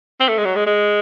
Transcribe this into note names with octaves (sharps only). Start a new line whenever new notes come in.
C4
A3
G#3
F#3
G#3
G#3